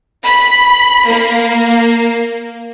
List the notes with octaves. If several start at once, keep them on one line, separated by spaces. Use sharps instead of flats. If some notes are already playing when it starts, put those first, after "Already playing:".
B5
A#3